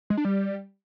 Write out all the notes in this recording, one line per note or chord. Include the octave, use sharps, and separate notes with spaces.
G#3
D4
G3